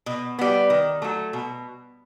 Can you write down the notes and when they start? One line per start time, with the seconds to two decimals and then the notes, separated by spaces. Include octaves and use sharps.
0.06 B2
0.39 G3 B3
0.70 D#3
1.02 F#3 A3
1.33 B2